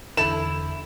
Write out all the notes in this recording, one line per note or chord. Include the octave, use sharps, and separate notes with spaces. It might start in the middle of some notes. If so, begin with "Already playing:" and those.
E2 D3 E4 A4 E7